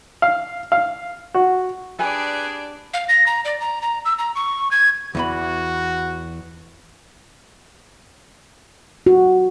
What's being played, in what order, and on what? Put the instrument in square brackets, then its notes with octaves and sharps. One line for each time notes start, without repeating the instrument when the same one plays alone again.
[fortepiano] F5
F5
F#4
[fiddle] D4 D5 [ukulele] G4 G#5 [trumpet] G#4 [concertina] B4
[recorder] F5
A#6
A#5
D5
A#5
A#5
E6
A#5
C#6
G#6
[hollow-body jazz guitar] E2 E3 B5 [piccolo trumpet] F#4
[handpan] F#4